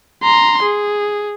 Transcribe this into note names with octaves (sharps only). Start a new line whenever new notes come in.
A#5 C6
G#4